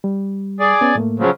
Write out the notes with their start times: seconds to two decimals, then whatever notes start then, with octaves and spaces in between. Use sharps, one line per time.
0.04 G3
0.60 G#4 D5
0.81 B3 C#4
0.95 A2 A3 A#3
1.19 C#3 F3 F#3